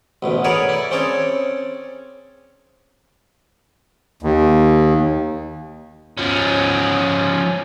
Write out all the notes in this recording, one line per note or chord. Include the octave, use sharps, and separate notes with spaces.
A1 D2 B2
G#4 A#4 B4 C#5 D5 F#5
E4 D5
C4 C#4 G#4 A4 C#5 D5
D#2
F3 C#4